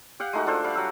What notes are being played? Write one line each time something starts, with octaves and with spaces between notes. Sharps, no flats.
G4 F5 F#5
G#3 A3 D#4 F#4
D4 F4 A4 C5
G3 F5 F#5 D6
F#3 E6